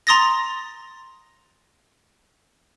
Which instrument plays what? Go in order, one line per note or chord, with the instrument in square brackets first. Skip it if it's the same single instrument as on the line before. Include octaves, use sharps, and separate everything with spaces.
[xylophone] A#5 C6 D#6 A6 A#6